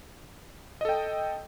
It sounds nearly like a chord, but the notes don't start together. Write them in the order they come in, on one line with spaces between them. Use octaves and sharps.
D#5 A4 G5